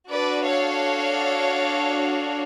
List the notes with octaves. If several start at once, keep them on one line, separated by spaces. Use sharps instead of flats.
D4 F#4 A4 B4 D5
C#5 F5